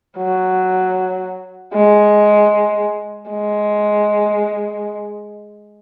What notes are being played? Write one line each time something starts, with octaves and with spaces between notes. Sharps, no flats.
F#3
G#3
G#3